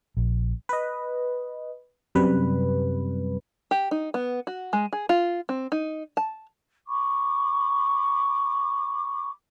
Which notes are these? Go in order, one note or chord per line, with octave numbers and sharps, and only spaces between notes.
A#1
B4 D#5
F#2 C3 G3 B4
G4
D#4
B3
F#4
G#3
G#4
F4
C4
D#4
A5
B5 C#6 D6